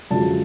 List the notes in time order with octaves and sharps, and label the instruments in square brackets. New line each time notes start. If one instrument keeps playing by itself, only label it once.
[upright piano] F#2 D3 F3 G#3 A5